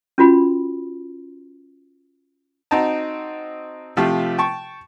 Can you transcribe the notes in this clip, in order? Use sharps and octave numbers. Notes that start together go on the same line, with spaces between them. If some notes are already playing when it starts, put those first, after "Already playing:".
C#4 F4 F#4 B5
C4 D#4 F#4 D#5 A5 A#5
C3 F3 A3 F4 G4
G5 A5 C#6